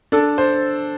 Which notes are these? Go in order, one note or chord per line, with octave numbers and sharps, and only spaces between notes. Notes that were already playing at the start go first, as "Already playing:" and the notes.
D4 A4
C5